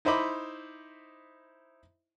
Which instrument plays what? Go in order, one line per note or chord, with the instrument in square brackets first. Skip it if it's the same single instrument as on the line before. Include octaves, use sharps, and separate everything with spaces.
[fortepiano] D#4 E4 C5 D#5 B5 D6